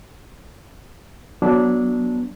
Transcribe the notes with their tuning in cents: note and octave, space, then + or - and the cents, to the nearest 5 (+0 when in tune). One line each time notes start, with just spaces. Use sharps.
F#3 +0 B3 -25 D4 -10